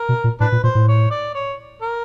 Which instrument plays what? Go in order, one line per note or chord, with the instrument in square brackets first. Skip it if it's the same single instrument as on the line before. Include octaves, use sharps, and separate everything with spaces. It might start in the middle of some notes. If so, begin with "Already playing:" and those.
Already playing: [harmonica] A#4
[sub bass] B2
A#2
[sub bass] A2 [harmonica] D4 B4
[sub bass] A#2
[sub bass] A#2 [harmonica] C5
[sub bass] A2
[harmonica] C#5
D5
C#5
A#4